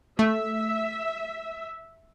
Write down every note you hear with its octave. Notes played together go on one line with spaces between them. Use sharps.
A3 E5